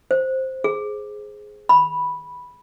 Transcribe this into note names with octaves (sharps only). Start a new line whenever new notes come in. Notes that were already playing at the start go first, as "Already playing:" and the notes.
C5
G#4
B5